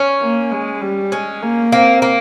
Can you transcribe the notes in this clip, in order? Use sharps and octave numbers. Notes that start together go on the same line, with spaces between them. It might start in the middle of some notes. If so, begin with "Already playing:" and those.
Already playing: C#4
A#3
G#3
G3
G#3 C#4
A#3
A#3 C4
A#3